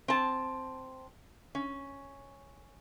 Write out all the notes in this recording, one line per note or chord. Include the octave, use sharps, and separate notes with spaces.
C4 A5
C#4